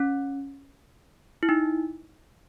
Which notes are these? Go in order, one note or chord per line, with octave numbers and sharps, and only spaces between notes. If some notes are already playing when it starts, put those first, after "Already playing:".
Already playing: C#4
E4
D#4